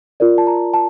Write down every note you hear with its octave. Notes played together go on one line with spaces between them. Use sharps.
F4 A#4 D5
A5
A#5
A5